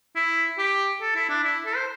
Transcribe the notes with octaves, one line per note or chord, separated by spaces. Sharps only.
E4
G4
A4
E4
D4
E4
A4
C5